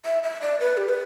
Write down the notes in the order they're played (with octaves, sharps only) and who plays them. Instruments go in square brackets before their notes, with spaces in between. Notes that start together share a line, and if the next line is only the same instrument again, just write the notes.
[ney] E5
E5
D5
B4
G4
B4